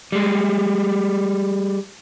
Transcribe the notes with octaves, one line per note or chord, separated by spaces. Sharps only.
G3 G#3